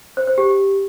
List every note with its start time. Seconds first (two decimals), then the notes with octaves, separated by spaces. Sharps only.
0.17 C5
0.27 C5
0.38 G4